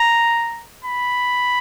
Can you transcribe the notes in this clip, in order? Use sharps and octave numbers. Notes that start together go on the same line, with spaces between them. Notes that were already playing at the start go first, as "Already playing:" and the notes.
Already playing: A#5
B5